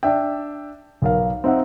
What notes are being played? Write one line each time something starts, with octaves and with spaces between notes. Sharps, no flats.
D4 E5 G5
B1 A#4 F5
C4 D#4 E5 F#5